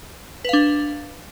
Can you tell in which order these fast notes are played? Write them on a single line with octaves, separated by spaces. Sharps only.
B4 F5 D4